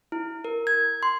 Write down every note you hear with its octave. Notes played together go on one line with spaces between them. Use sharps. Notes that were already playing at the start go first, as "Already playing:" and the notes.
E4
A#4
G#6
C6